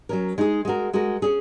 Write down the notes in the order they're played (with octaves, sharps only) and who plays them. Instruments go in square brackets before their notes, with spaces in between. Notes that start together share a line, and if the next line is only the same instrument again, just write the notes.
[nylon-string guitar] F#3 C#4 A#4
G#3 D#4 G#4
G#3 F#4 A#4
G#3 F#4 A#4
C#4 G#4